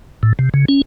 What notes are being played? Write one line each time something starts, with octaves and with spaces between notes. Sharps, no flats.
A2
C3
C#3
C#4